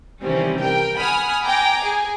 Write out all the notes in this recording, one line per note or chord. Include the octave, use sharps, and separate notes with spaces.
C3 D#3 E3 G3 C4 C#4
A#4 G5
F#5 G#5 B5 D#6 F6
G5 G#5 A#5 D6
G#4